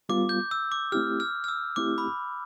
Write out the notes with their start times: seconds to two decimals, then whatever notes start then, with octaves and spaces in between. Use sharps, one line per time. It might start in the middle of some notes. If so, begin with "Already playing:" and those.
0.09 G3 B3 F4 D6
0.29 G6
0.51 E6
0.72 D6
0.92 A3 C4 E4 G4 F6
1.20 F6
1.44 F6
1.48 E6
1.76 A3 C4 E4 G4 D6
1.98 B5